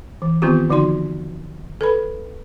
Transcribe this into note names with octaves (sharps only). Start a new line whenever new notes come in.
E3
D#3 B3 C4 F4 G4
D3 F3 D#4 F#4 C6
A4 B4 B5